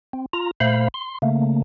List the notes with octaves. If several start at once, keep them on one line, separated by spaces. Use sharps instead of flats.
C4
F4 A#5
A#2 A3 C5 F5 B5
C6
C#3 A3 A#3